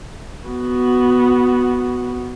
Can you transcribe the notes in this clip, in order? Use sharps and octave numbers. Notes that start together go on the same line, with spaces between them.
B3 F#4